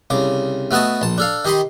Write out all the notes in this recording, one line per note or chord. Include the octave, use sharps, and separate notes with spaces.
C2 C#3 D6
A3 B3 F#4 D#5 A5
A#1 A5
D4 A4 F5
D#3 G4 D#5 B5 C6